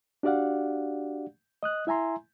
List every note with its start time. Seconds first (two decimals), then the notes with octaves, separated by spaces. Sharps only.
0.23 D4 F#4 G4 D5 F5 F#5
1.63 D#5 D#6 F#6
1.87 E4 E5 G#5 A#5 C6